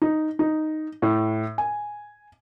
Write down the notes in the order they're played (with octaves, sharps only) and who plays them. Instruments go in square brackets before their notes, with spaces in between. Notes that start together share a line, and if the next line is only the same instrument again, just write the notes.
[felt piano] D#4
D#4
A2
G#5